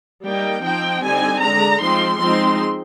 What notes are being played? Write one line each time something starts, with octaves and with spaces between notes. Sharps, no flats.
G3 A#3 D#4 G5
F3 C4 D#4 G5
D3 G3 C4 D#4 G#5
D3 G#3 D4 A#5
F3 G#3 C4 D#4 C6
F3 G#3 C4 D#4 C6